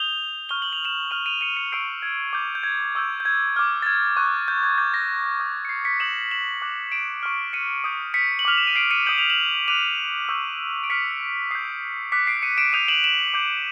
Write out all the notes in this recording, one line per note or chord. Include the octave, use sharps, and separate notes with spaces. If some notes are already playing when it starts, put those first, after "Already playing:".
Already playing: D#6 G6 F7 G7
C#6 F6 G7
F#7
F7
E7 F#7
C#6 F6 D#7 F7
D#7 F7
C#7 D#7
C#7 D#7
C#6 E6 G6 C7 D7
G#6
D6 G6
G6
G#6
C#6 E6 G6
G6
G#6
D6 F6
A6
G#6
C#6 F#6
G6
G#6
D6 G6 A6
A#6
D#6 G6
C#7
C7
B6 C#7
D#6 G6 E7 F#7
E7 F#7
D6 F#6
D7 E7
C#6 F6
C#7 D#7
D#6 G6
B6 C#7
F#7
D6 F6 F7
E7
D#7
C7 D7
C#7 D#7
D#6 G6 F#7
F7
E7 F#7
D6 F#6 D#7 F7
C#6 E6 G6
D7
D6 F6 B6 C#7
D#6 G6 C7
D6 F#6 B6 C#7
C7 D7
C#7 D#7
D7 E7
D#6 G6 D#7 F7
E7 F#7
E7 F#7
D6 G6